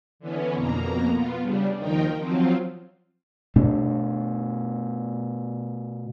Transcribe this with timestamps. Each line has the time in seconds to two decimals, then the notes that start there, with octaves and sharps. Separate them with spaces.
0.19 D3 E3 B3 C#4
0.54 F2 B2 A#3 A#5
1.08 B3 F4
1.40 C#3 G3 D4
1.78 D#2 D#3 F3 D#4 A#4 G5
2.17 F3 F#3 C4 F4
3.56 B2 A3 D4